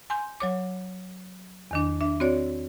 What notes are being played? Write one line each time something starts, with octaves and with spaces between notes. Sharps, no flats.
G#5 C6 G6
F#3 C#5 D6
E2 D#3 D4
D4 E5
C4 F#4 C#5 D5